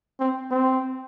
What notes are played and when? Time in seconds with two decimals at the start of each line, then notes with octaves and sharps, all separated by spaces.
0.20 C4
0.51 C4